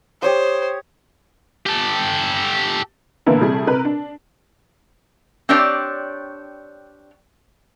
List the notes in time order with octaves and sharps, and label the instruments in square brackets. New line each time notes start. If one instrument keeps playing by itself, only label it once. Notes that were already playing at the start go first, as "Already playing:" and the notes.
[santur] G4 C#5 D#6 [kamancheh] C5
[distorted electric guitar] G4 A4
[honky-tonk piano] A#2 D3 E3 A#3 B3 E4
C3 G3 A3 E4 G#4
C3 A#4 B4
D4
[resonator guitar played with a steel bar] C4 D4 G4 C#5 D5